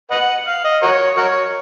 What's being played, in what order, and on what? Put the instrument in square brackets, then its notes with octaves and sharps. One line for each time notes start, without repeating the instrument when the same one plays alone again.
[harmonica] B4 D#5 F#5
F5
D#5
F#4 A#4 C#5
F#4 A#4 C#5